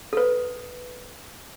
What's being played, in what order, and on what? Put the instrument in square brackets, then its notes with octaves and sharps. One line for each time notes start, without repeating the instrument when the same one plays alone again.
[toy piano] A4 B4